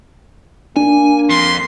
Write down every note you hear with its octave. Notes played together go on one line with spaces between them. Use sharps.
A#3 D4 G#5
F2 C6